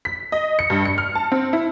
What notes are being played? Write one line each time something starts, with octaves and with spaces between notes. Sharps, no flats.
B6
D#5
C#7
G2
C#7
F6
A5
C4
E4